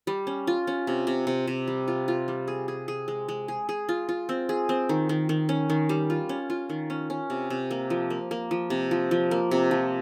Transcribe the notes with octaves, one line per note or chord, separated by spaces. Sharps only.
G3
C#4
F4
C#4
C3
C3
C3
C3
G3
F4
F4
G3
G#4
G#4
G#4
G#3
G#3
G#4
G#4
F4
F4
C4
G#4
C4
D#3
D#3
D#3
C#4
D#3
G3
F4
C#4
F4
D#3
C#4
C#4
C3
C3
A#3
F3
A#3
A#3
F3
C3
F3
F3
A#3
C3
F3